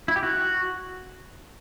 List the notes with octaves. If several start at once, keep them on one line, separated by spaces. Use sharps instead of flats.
E4
G4
F#4